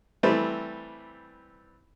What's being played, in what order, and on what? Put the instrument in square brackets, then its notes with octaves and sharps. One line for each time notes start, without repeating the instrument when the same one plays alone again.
[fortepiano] E3 G3 A3 C4